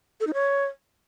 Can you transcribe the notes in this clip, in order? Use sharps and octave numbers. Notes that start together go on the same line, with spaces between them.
A4
D#4
C#5